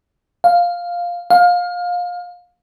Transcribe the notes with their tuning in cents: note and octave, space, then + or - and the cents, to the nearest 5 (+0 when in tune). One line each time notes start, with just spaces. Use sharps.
F5 +5
F5 +25